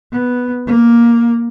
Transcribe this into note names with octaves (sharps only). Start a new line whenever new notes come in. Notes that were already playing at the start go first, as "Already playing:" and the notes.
B3
A#3